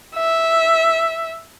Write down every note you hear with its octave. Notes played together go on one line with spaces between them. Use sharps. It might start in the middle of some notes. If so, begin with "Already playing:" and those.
E5